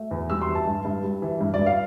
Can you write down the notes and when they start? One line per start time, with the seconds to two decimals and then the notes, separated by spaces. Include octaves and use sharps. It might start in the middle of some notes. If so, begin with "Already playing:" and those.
Already playing: A3
0.11 E2
0.30 G3 E6
0.42 C6
0.48 E3
0.55 A5
0.67 G2
0.85 G2
1.03 G3
1.22 E3
1.41 G2
1.54 D5
1.59 G2
1.66 F5